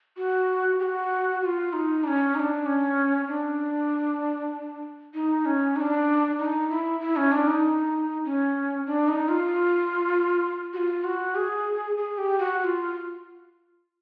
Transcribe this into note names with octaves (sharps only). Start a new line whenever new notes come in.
F#4
G4
F#4
F#4
F4
D#4
D4
C#4
D#4
D4
C#4
D4
D#4
C#4
D#4
D4
D#4
E4
E4
C#4
D4
D#4
C#4
D4
D#4
F4
F#4
F4
F#4
G#4
G#4
G4
F#4
F#4
F4
F4